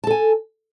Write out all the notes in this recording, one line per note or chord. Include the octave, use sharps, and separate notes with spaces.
A4 G#5 A5